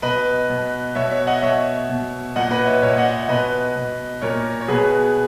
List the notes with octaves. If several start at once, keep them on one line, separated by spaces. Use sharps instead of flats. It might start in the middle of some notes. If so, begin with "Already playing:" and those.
B2 B4 D#5
B2
B2 C#5 E5
C#5 E5
D#5 F#5
B2 C#5 E5
B2
A#2 D#5 F#5
B4 D#5
C#5 E5
A#2 C#5 E5
D#5 F#5
B2 B4 D#5
B2
A#2 A#4 C#5
C#5
B2 G#4 B4